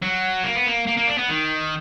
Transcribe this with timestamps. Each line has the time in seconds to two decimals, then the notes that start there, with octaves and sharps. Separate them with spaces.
0.02 F#3
0.44 A#3
0.55 B3
0.66 A#3
0.87 A#3
0.97 A#3
1.07 D4
1.18 B3
1.29 D#3